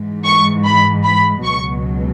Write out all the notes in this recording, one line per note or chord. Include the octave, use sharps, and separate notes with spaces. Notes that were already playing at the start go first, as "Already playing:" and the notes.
Already playing: G#2 E3
C#6
B5
B5
C#2 B2 F#3 C#6